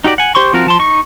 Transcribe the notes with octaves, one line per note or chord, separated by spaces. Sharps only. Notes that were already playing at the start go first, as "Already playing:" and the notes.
D#4 F#4 G4 D5
F#5 G#5
G4 C5 C6 C#6
F3 C4 F4 F#4 A#4
F3 A5 C6
D#4 C#6